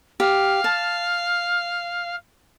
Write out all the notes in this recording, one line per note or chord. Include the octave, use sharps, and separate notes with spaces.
G4 F5
A5